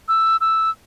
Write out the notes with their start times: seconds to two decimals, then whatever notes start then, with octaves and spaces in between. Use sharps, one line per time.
0.08 E6
0.41 E6